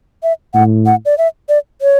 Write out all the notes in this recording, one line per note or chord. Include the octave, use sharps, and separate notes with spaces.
E5
A2 F#5
F#5
D5
E5
D5
C#5